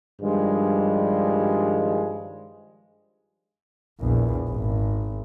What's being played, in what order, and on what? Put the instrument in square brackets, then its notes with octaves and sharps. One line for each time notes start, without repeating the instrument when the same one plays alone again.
[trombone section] G2 D#3 F3 G3 G#3
[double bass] A#1 E2
G#1